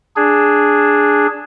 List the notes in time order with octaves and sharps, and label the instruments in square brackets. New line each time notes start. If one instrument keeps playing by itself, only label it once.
[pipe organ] D4 G#4